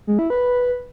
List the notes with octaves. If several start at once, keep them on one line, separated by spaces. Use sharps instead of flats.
G#3
E4
B4